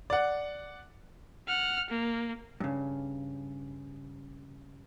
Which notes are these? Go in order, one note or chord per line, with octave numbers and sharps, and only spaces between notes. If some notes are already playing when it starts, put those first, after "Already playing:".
D5 F#5
F#5 F6
A#3
G2 C#3